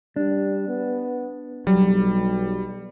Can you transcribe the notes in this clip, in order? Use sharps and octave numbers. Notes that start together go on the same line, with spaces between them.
G3 D4
B3
B1 F#3 G3